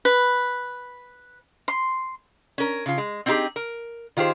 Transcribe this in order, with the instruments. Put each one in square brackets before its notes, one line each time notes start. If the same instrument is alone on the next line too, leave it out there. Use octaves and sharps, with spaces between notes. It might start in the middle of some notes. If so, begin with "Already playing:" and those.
[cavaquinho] B4
C6
[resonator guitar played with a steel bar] C#4 A#4
C#3 F4
G#3
C4 C#4 D#4 E4 G4 G#4
A#4
D#3 F4 G4 G#4 C5